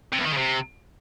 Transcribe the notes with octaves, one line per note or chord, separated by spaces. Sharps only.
C3
E2
D#3
C#3
C3